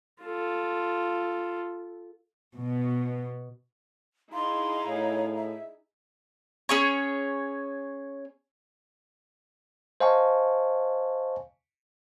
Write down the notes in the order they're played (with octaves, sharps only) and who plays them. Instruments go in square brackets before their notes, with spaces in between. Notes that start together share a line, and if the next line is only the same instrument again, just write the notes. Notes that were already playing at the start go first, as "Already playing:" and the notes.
[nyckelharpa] F4 A4
[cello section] B2
[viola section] D#4 E4 G#4 [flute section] F5 A#5 [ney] C6
[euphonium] A2 [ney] C#5
[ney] E5
[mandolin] C#4 G#4 C#5
[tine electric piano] C5 D#5 F5 G#5 A5 C#6